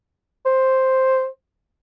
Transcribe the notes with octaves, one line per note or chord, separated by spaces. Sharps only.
C5